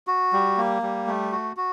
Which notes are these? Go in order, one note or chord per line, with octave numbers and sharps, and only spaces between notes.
F#4
G3
A#3
G3
A3
F#4
F#4